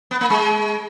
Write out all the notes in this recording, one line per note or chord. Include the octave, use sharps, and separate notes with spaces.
B3
A#3
G#3